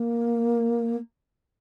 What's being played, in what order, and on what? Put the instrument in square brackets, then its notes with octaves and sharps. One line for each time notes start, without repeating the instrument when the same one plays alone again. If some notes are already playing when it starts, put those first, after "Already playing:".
Already playing: [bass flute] A#3